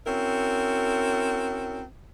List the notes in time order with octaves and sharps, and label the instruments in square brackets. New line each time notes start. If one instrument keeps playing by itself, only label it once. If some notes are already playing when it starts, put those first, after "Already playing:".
[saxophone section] C4 C#4 E4 F#4 A#4